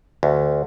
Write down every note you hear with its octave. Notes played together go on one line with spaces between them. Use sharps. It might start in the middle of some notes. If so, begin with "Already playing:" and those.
D2